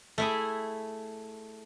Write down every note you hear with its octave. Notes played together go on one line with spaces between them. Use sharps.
A3 E4 G#4